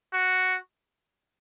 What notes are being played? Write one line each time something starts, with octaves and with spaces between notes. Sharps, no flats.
F#4